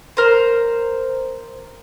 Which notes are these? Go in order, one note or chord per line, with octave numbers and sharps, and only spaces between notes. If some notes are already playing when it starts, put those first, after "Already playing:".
A#4 C5